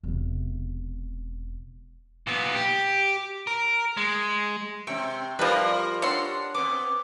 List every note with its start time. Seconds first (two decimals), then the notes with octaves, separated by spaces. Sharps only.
0.03 E1 C3
2.27 A#2 B3
2.55 G4
3.47 A#4
3.97 G#3
4.87 C3 C4 G5 C#6 E6
5.39 F3 G3 F4 A#4 B4
6.02 D4 C#5 F#5 C6 E6
6.55 B3 C4 D6